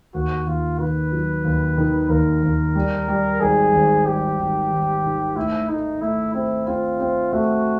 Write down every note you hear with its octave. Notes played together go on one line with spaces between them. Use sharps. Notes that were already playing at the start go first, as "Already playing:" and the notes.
D#2 F#4
D#2 F4
D#3 B4
F#3
D#2
D#3
D#2 A#4
D#2
G3
G3
G#1 G#4
G#1
G3 G4
G#1
G#1
D#3
A2 E4
A3 D#4
A3 E4
C4 E4
C4 F4
C4
A3 F#4